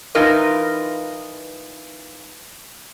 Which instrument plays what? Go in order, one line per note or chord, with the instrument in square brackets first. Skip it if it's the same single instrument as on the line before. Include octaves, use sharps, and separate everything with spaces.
[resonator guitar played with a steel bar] E3 D#4 F4 A#4 B4